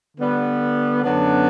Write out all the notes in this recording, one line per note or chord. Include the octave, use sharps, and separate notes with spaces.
D3 G3 B3
F#2 D3 F#3 B3 D4